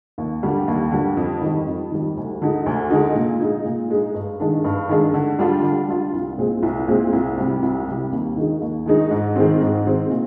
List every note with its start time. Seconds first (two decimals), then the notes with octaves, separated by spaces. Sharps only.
0.18 D#2
0.43 D3 G3
0.68 D#2
0.92 D3 G3
1.17 F2
1.42 D#3 G3
1.67 F2
1.91 D#3 G3
2.17 D2
2.42 D3 G#3 D#4
2.66 D2
2.90 D3 G#3 D#4
3.15 A#2
3.40 G#3 D#4
3.65 A#2
3.90 G#3 D#4
4.14 G2
4.40 D#3 G#3 D4
4.64 G2
4.89 D#3 G#3 D4
5.14 D3
5.39 G3 D4 F4
5.63 D3
5.88 G3 D4 F4
6.14 C2
6.38 A#2 G#3 C4
6.63 C2
6.88 A#2 G#3 C4
7.13 C2
7.37 C3 G3
7.62 C2
7.87 C3 G3
8.12 D#2
8.36 D#3 G#3 D#4
8.61 D#2
8.86 D#3 G#3 D#4
9.11 G#2
9.36 D#3 G#3 C4
9.61 G#2
9.86 D#3 G#3 C4
10.10 A#2